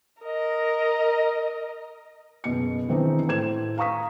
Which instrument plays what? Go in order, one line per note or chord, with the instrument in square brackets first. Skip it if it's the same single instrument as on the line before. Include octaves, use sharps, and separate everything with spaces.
[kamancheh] A#4 D#5
[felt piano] F#1 B2 C#7
D#3 E3 C4 D4 D#4
A2 C5 G#6 E7
F5 A#5 C#6 D#6 B6